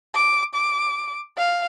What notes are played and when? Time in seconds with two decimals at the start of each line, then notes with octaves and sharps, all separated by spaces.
0.15 D6
0.55 D6
1.37 F5